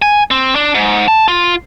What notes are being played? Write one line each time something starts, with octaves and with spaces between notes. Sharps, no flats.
G#5
C4
D4
G#2
A5
F4